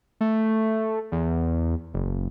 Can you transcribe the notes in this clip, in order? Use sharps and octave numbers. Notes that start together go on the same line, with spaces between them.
A3
E2
F#1